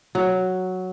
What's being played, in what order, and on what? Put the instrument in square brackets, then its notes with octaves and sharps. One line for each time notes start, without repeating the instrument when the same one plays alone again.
[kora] F#3